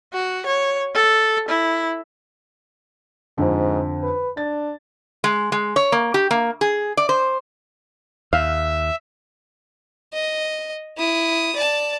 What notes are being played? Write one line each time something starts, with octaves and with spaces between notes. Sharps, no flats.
F#4
C#5
A4
E4
F2 G#2 D3
B4
D4 A6
G#3
G#3
C#5
A#3
G4
A#3
G#4
D5
C5
D#2 E5 F5
D#5
E4 D#6
D5 A5